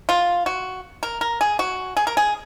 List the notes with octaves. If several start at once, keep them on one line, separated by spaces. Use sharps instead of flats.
F4
F#4
A#4
A#4
G#4
F#4
G#4
A#4
G#4